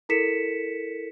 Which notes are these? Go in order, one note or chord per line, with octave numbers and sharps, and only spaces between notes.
E4 A4 A#4 B6 C#7 E7